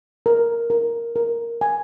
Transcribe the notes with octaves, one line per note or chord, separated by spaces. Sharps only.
A#4
A#4
A#4
G#5